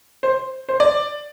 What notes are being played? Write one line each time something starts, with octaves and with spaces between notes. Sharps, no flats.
C5
C5
D5